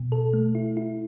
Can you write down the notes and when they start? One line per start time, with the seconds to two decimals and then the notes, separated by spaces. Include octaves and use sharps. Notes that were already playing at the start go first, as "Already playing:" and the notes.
Already playing: B2
0.12 A4
0.33 A3
0.55 E4
0.77 E4